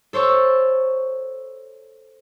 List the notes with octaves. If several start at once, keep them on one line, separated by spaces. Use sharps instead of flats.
A4 C5 C#5 C#6 E6